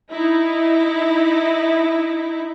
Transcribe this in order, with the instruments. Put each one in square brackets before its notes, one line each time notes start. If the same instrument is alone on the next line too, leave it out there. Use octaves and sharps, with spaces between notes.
[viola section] D#4 E4